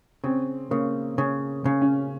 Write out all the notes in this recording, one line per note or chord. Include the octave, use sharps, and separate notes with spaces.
C#3 C4
C#3 A#3
C#3 C#4
C#3
C#4